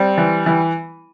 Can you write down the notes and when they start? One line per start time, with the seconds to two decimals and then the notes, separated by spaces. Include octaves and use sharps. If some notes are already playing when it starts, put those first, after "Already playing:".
Already playing: G3 C4
0.18 E3
0.46 E3